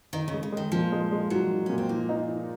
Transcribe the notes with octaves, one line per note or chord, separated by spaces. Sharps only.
D#3 D#4
C#3
G#3
C#3
D#3 G#3
A#2 F3
G#3
G#3
F3 F#3
F3
A#2 C#4
C4
F3 A#3
D#4
F3